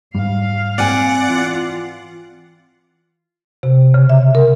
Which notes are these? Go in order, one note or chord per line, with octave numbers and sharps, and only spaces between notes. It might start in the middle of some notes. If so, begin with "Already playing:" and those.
G#2 G3 F5
C4 D5 F#5 G#5
E3 F4
C3
C#3
E5
A#4